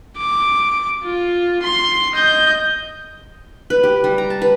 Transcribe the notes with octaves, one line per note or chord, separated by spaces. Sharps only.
D6
F4
C6
D#5 G6
B4
G4
G3
A#5
A5
B4